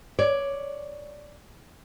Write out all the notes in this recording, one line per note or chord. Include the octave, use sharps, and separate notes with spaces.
C#5 D5